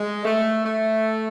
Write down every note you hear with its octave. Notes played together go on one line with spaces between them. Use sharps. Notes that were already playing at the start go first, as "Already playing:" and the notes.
Already playing: G#3
A3
A3